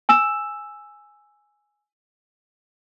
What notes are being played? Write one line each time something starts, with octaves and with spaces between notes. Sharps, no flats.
G#5 E6 E7